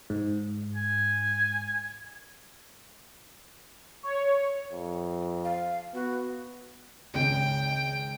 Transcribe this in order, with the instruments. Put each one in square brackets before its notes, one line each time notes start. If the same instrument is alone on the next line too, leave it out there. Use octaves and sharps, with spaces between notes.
[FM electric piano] G#2
[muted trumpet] G#5
[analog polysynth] C#5
[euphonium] F2
[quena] F5
[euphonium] B3 [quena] F#4
[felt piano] G#1 C#2 C#3 [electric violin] G5